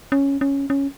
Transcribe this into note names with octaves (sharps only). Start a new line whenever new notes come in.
C#4
C#4
C#4